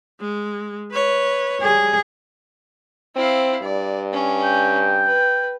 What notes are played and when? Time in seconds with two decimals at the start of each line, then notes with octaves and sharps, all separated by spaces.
0.21 G#3
0.92 B4 C#5
1.62 G3 G#4
3.16 C4 E4 F5
3.62 G2 D5
4.13 C#4
4.44 G5
5.05 B4